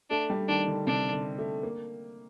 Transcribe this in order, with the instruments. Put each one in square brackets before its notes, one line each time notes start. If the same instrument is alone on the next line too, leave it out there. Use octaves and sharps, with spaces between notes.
[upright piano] A3 [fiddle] D4
[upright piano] G3
[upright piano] D#3 [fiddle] D4
[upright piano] D3
[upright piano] C3 [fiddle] D4
[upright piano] D3
A3
A#3